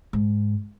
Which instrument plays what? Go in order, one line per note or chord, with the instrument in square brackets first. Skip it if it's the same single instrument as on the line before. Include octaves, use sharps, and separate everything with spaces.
[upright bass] G#2